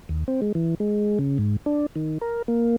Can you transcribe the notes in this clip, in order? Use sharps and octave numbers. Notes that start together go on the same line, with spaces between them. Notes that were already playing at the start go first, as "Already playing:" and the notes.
D#2
C4
G#3
E3
G#3
C#3
G#2
D4
D#3
A#4
A#3